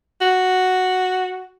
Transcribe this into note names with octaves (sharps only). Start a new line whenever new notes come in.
F#4